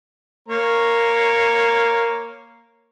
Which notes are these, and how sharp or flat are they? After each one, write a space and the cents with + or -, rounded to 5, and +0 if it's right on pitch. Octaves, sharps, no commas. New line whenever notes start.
A#3 -5 C#5 -10 A#5 +0